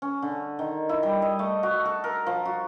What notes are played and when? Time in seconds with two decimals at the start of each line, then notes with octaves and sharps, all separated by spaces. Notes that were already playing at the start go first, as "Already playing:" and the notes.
0.02 C#4
0.22 D3
0.59 D#3
0.89 E4
1.03 G3
1.22 D#5
1.39 A3
1.63 F#4
1.85 A4
2.04 A#4
2.26 F3
2.45 F#4